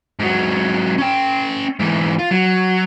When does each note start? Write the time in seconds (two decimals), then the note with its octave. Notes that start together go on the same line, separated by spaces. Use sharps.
0.19 G#2 F#3
0.98 C#4 G5
1.79 G#2 E3
2.19 F4
2.31 F#3